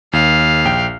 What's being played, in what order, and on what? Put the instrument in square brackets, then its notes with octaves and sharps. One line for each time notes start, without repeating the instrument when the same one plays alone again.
[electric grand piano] D#2 [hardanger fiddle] F5
[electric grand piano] A#1 G5